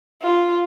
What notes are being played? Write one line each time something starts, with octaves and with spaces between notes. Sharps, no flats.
F4